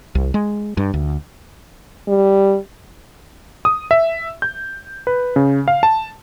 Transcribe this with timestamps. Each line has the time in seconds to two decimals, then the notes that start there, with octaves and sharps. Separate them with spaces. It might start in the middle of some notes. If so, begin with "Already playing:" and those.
0.15 C2
0.34 G#3
0.77 G2
0.94 D2
2.08 G3
3.65 D#6
3.91 E5
4.42 G6
5.07 B4
5.36 C#3
5.68 F5
5.83 A5